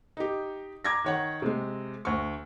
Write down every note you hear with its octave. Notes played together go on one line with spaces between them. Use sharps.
D#4 G4
A#5 D6 G#6 A#6
D#3 C#5 F#5
C3 G#3
D2 C#6